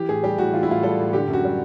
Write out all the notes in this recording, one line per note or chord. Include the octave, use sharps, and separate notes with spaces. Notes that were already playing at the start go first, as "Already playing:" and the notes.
Already playing: E3 G4
A2 G#4
G3 G4
A2 F#4
E3 F4
E4
A2 F4
G3 A4
A2
D3 G4
F#2
F#4
G3